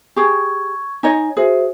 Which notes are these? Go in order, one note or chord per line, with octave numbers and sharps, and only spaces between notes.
G4 G#4 C#6 G#6
D#4 C#5 D#5 G#5
F#4 G#4 C5 E5